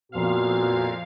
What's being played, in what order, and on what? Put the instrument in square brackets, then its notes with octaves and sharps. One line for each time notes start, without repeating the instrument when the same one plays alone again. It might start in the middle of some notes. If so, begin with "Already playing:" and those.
[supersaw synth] F2 F5 [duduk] A#2 [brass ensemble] B3 F#4